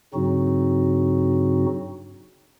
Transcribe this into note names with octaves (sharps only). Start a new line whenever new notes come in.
G2 C#3 F#3 C4 D#4 F#4